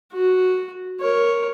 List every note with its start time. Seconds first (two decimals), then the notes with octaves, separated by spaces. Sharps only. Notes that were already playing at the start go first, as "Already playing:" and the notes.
0.13 F#4
1.01 A#4 C#5